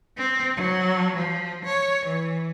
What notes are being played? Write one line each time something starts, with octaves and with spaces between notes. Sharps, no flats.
C4
F#3
F3
C#5
E3